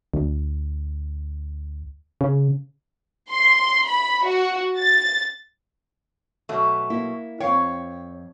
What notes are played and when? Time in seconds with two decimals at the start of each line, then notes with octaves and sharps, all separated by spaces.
0.14 D2
2.21 C#3
3.31 C6
3.87 B5
4.26 F#4
4.78 A6
6.49 B2 F#3 A3
6.90 A#3 E4
7.40 F2 C#5 F5 G5